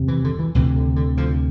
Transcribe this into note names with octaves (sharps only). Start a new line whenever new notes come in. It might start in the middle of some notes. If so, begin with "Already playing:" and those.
Already playing: E2 C3
E3
D3
E3
D2 C3 E3
D3
D3
D3 F3